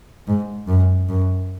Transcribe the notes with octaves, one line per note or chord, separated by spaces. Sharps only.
G#2
F#2
F#2